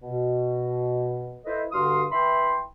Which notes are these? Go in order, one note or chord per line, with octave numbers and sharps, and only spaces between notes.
B2
E4 A4 B4 C5 D#5
G2 D3 F#4 F5 C6 D#6
E3 E5 G5 B5 C6